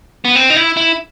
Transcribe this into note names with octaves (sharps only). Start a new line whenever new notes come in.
B3
C4
D#4
E4
E4